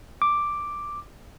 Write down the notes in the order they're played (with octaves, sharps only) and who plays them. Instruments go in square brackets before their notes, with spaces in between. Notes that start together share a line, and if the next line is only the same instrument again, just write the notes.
[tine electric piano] D6